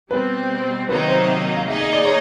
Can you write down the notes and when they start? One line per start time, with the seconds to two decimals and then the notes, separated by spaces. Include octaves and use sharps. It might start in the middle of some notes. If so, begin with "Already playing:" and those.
0.11 B2 G3 C4 B4
0.88 C3 D#3 F#3 A#3 D#4 B4
1.08 C5
1.27 E5
1.56 F5
1.67 A#3 D#4 G#4 E5
1.81 D#5
1.93 D5
2.05 C#5